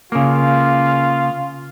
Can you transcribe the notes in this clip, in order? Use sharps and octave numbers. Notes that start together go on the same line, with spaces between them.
C#3 A#3 F4